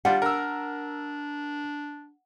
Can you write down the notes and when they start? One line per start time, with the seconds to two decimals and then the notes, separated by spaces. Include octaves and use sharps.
0.05 G3 D4 F4 F#5
0.22 D4 A#4 E6